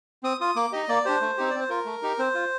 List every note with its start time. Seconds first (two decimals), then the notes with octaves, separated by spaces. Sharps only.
0.23 C4 D#6
0.41 F4 D#6
0.56 A#3 D6
0.72 D#4 G4 D#5
0.89 A#3 D5
1.05 D4 G4 C5
1.21 A3
1.38 C4 D#4 G4
1.50 C4 D5
1.60 C5
1.69 F4 A#4
1.86 A3
2.03 D#4 G4
2.19 C4 C5
2.35 F4